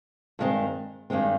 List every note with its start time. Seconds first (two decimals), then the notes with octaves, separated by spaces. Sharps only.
0.39 G2 D#3 G#3 C4
1.10 G2 D#3 G#3 C4